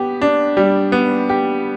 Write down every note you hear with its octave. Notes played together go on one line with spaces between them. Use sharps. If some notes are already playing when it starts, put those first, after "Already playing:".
Already playing: B3 G4
D4
G3
B3
G4